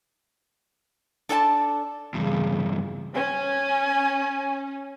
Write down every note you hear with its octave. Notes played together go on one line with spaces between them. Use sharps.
D4 A4 D5 G#5 A5
E2 G2 C#3
C#4 G#5